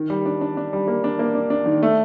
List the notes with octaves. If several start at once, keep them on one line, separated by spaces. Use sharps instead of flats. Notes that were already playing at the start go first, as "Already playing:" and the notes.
Already playing: D#3
G3
D4
D4
D4
G3
A#3
D4
A#3
D4
D4
D#3
A3